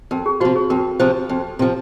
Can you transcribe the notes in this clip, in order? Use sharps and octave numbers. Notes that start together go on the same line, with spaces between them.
F2 A#4
G#4
C3 F3 F#4
G#4
F2 A#4
C3 F3 C5
F2
C3 F3